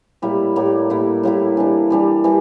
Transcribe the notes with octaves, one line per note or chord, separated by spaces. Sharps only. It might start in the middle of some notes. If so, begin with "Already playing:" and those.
A2 G3 A#3 E4
A2 G3 A#3 E4
A2 G3 A#3 E4
A2 G3 A#3 E4
E3 G3 D4
E3 G3 D4
E3 G3